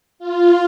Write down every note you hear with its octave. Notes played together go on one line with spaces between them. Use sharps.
F4